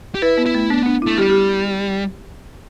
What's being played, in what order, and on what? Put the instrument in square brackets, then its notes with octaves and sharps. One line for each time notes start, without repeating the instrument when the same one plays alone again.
[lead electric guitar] G4
[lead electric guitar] E4 [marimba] B4
[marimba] B3
[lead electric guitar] E4
[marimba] A3
[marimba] B3 [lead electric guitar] D4
[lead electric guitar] B3 [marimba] D4
[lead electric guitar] A3 [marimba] E4
[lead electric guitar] G3 [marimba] G4
[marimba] G4